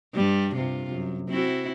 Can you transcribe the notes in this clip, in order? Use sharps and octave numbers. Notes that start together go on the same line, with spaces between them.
G2 G3
G2 C3 F4
F#2
C4 E4 F#4